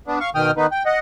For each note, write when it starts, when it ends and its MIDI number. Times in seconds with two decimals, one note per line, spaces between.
0.08 0.19 59
0.08 0.19 62
0.20 0.30 77
0.20 0.30 85
0.35 0.51 47
0.35 0.51 51
0.35 0.51 79
0.35 0.51 87
0.35 0.51 89
0.57 0.67 51
0.57 0.67 59
0.57 0.67 63
0.57 0.67 71
0.72 0.83 79
0.86 0.99 75
0.86 0.99 78